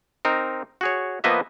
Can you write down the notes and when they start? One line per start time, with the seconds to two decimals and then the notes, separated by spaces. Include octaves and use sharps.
0.25 C4 D#4 A#4
0.81 F#4 G#4 C#5
1.24 F3 A#3 B3 B4 D#5 E5